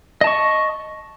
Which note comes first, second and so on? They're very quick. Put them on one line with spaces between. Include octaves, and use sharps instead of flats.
D#5 A5 C#6